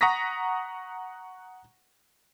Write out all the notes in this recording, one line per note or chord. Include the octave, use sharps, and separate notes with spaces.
F#5 A#5 C#6 D#6 A#6 B6